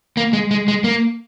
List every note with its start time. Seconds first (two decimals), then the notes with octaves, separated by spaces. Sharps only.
0.17 A#3
0.33 G#3
0.51 G#3
0.68 G#3
0.84 A#3